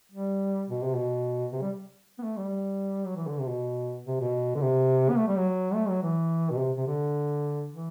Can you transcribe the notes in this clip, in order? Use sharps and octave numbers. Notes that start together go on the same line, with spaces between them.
G3
B2
C3
B2
C3
G3
B3
A3
G3
F#3
E3
D3
C3
B2
C3
B2
D3
C3
B3
A3
G3
F#3
A3
F#3
E3
B2
C3
C3
D3
E3